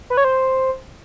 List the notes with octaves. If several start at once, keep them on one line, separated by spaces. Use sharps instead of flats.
B4
C#5
C5